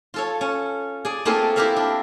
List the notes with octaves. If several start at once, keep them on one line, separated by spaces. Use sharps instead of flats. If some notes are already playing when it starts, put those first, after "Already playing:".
F4 A4 C#5
C#4
G#4 D5
A3 A#3 C4 F4 G#4 A4
E4 F4 G4 A#4 E5 F5
D4